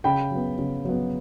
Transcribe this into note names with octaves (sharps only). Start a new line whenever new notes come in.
C#3 G5 B5
F#3 B3
C#3
F#3 B3